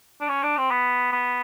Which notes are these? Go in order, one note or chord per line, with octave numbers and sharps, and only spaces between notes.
D4
C#4
D4
C4
B3
B3